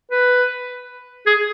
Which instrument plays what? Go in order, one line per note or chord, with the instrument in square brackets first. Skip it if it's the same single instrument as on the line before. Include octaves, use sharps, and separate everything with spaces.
[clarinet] B4
G#4